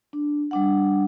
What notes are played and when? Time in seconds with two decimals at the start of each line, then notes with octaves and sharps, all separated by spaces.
0.13 D4
0.51 G3 D4 F#5